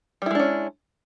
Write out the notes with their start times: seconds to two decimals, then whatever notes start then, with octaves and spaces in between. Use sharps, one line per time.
0.22 G3
0.26 E4
0.31 G#3
0.35 D4
0.39 C#4